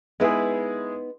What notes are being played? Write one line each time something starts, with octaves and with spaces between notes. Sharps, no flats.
G#3 B3 D#4 E4 G#4 B4